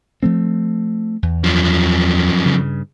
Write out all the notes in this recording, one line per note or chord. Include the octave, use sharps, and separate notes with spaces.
F3 A3 C4
E2
F#2 F3
G2 C#3